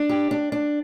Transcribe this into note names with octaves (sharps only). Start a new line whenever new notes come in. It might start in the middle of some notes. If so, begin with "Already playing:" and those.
Already playing: D4
G4
D4
D4